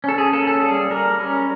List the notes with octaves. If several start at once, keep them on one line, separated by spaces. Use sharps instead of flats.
C#4 A4
G#4
A#3 A4
A4
G3 G#4
G3 A#4
C#4